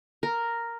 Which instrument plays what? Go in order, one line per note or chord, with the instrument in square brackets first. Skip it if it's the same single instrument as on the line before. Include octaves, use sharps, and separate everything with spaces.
[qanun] A#4